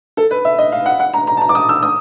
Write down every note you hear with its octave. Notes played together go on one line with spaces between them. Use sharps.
A4
B4
E5
D#5
F5
F#5
F#5
A#5
A#5
A5
A#5
D6
D#6
E6
D#6